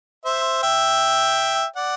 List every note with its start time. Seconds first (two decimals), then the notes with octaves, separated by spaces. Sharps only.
0.25 C5 E5
0.63 E5 G5
1.76 D5 F#5